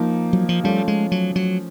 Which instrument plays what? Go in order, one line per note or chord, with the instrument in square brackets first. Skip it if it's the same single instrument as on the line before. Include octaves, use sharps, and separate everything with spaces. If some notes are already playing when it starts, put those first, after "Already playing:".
Already playing: [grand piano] F3 A#3 D#4
[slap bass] F#3
F3
[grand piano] F3 A3 C#4 [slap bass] G3
[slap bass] G#3
F#3
F#3